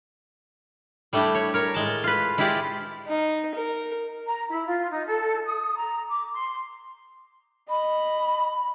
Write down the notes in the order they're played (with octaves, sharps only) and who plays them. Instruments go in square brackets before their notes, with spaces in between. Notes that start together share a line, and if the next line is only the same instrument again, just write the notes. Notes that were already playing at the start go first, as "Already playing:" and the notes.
[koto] G3 A3 D4 E4 G4
C#5
A#4 C#5
A2 G#3 A5
F4 B4
G#3 E4 F4 G4 B4 D5
[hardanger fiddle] D#4
A#4
[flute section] A#5
E4
F4
D#4
A4
D#6
A#5
D6
C6
[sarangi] D#5 [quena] B5